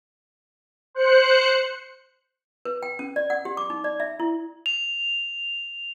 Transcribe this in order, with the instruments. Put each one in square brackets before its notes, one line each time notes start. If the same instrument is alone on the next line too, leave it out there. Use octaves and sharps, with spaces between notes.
[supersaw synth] C5 F#6 C#7
[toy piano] B4
G5
C#4
D5
F#5
G4
D6
D#4
D5
E5
E4
[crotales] F7